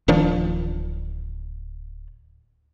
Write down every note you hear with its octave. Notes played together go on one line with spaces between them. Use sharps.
D1 D#3 F3 D4